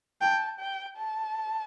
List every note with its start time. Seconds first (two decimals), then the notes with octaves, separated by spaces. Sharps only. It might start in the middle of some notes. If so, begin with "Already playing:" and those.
0.21 G5 A5
0.60 G5
0.97 A5